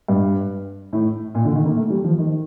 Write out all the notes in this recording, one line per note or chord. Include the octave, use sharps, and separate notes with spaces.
G2
A2
A#2
D3
D#3
A#3
A3
G3
F3
D#3